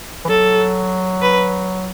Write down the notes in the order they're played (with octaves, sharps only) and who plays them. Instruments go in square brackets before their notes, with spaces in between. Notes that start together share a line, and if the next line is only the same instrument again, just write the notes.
[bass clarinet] E3
[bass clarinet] F#3 [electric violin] A4
[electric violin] B4